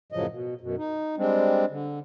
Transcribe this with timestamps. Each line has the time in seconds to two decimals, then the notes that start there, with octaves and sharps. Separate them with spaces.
0.12 F#2 A2 C#3 F3 F#3 D#5
0.32 B2
0.61 F#2 B2
0.78 D#4
1.17 G3 G#3 C4 D4
1.70 D3